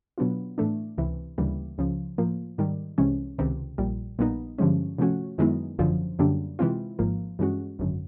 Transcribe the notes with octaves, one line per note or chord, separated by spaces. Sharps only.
B2 F#3 B3 D4 F4
A2 E3 A3 D4
C#2 C3 E3
D2 C#3 E3 G3 A#3
C#2 C#3 F3
A2 F3 A#3
G#2 D#3 G3
C2 C3 E3 G#3 C#4
C#2 C3 D#3
A#1 A#2 G3
A#1 A#2 G3 B3 D#4
G2 D3 F3 G#3 C#4
C3 F3 A3 C#4 F#4
F#2 D#3 G#3 B3 E4
G#1 F#2 D3 F3
F#2 D3 G3 A#3 D4
C3 E3 G#3 C4 F4
G#1 G#2 F3 A#3
G2 E3 G#3 C#4 F#4
G#1 F#2 D3